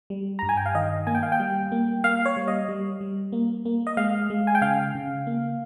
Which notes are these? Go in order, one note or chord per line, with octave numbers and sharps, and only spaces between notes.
G3
G2 A#5
G#5
G5
F5
D#3 D#5
A#3 G#5
G5
F5
G5
G3
A#3
A#3 F5
C#5
G3
D#5
G3
G3
A#3
A#3
D#5
G#3 F5
G#3
G#5
G5
C#3 F5
C#3
A#3